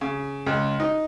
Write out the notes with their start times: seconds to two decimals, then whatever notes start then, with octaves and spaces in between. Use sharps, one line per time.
0.01 C#3
0.46 C#2
0.80 D#4